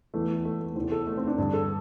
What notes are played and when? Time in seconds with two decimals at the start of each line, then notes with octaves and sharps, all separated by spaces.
0.14 E2 E3 A3
0.45 A3
0.60 A3
0.76 E2 C3 E3 C4
0.92 A4
1.07 A3
1.17 C4
1.27 D4
1.38 G2 D3
1.53 A4